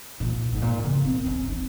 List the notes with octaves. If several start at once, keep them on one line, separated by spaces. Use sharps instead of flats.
A#2
G#2
A#2
C#3
C4
C#4
D#4